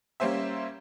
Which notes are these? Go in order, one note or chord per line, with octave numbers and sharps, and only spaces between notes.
G3 A#3 C#4 C5 E5